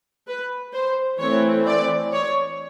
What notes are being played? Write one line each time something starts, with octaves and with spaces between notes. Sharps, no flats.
B4
C5
E3 A3 C4 C#5
D5
C#5